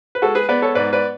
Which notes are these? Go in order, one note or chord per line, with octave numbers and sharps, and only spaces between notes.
B4
G#3 F#4 A4
G#4 B4
B3 B4 D5
A4 C#5
G#2 B4 D5
B4 D5